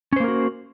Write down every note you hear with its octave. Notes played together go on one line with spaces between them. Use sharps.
A#3 C#4 F#4 A#4 C5